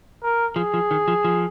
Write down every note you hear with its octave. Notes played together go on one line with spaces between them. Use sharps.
A#4
F3 G#4
F3
D#3
F3
F3